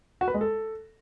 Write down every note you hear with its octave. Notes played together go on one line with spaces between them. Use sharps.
F#4
B4
G#3
A4